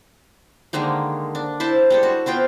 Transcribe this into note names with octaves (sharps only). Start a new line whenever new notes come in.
D3 D#3 G#3 A#3
D4
E4 C5 A5
G3 G#3 A4
F#4
B3 C4 F4 G5